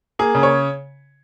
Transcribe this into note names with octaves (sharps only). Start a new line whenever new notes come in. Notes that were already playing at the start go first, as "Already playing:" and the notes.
A#3 G#4
C#3
C#5